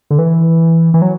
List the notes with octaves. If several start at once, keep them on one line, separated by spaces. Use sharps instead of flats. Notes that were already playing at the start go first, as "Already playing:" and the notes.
D3
E3
E3
F#3